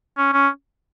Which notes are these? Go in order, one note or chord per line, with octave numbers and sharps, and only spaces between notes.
C#4
C#4